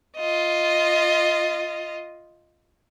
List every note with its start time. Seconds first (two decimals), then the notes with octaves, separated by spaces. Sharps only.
0.17 F4 D#5